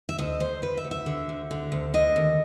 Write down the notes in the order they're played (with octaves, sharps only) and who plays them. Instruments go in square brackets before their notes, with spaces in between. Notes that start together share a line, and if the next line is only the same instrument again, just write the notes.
[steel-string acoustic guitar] E5
D2 D#5
D2 C5
D2 B4
E5
D2
E5
D3
D2
D3
D2
D3 D#5
D#2